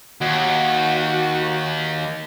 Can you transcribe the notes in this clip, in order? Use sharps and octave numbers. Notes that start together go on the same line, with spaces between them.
D#2 F#4